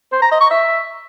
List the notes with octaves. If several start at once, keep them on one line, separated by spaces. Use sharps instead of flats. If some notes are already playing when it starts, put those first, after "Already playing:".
C5
A#5
D#5
C#6
E5